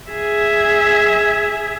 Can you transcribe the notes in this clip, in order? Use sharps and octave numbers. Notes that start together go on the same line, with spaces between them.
G#4 E5